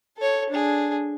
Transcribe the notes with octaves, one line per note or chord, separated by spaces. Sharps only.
A4 C#5
D4 G#4